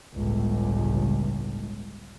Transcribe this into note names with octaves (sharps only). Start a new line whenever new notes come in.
G1 C#2 A2